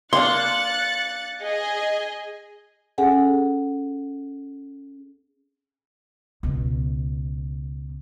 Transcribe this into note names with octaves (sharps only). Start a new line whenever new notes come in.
A#3 D4 C6 F#6 A6 C#7
G#4 D#5 G#5
C#4 G#4 A4 F#5 G#5
C#2 B2